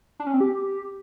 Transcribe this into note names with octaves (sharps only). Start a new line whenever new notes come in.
D4
C#4
C4
G4